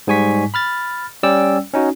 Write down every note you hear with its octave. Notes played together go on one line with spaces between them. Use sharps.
G#2 G3 G#5 C#6 B6
B5 F6 A6
G3 C#4 D5 G5 E6
C#4 D#4 F#4